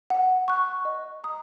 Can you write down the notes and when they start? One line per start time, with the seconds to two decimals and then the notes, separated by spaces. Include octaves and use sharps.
0.10 F#5
0.48 C#6 F#6
0.85 D#5
1.24 A#5 D#6